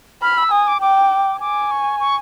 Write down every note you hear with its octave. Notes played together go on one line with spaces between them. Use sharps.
B5 F6
E6
G#5 D#6
D6
G5 D6
G#5 D6
C#6
C#6